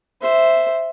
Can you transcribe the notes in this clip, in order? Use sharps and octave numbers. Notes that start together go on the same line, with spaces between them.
C5 E5